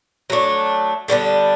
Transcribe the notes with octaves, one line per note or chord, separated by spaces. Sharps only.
F#3 A3 D4
D3 G3 B3 D4